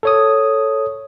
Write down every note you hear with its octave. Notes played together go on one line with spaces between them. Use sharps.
A4 C#5 D#6